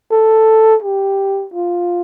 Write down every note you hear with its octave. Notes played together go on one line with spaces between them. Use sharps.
A4
G4
F4